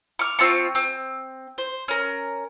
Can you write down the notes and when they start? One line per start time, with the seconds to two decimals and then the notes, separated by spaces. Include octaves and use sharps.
0.19 C#6 D6 F6
0.39 C4 F4 A5 C#6
0.75 C4
1.58 C5
1.88 C#4 A#4